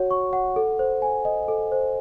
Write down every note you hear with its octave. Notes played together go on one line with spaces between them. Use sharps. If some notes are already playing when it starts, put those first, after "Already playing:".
Already playing: F#4 C#5 F#5
C#6
F#5
A4
C5
G#5
D#5
A4
C5